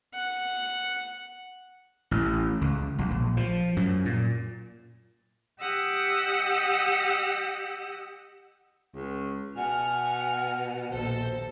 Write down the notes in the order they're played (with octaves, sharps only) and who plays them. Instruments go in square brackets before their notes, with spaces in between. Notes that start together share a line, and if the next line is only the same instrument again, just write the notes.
[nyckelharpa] F#5
[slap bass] A1
C#2
B1
A#1
F3
F#2
A#2
[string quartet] G4 D#5 F#5 E6
[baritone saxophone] C#2
[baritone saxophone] B2 [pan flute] F#5 [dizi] G#5 [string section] F6
[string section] A#1 D#2 A4 [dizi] C5